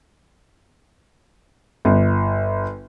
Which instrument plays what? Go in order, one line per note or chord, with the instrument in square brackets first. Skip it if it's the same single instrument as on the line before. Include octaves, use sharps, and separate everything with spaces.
[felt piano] G1